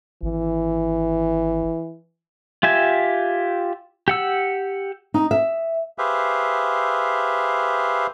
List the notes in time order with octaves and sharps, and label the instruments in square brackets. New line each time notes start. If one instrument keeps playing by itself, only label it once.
[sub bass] G#1 [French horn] E3
[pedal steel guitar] F4 G4 E5 G#5
G4 F#5 E6
[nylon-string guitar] D#4
E5
[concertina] G4 G#4 B4 C5 E5 F5